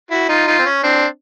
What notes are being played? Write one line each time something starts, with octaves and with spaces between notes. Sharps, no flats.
E4 F#4
D#4 F4
D#4 F4
C4
C#4
C4 D4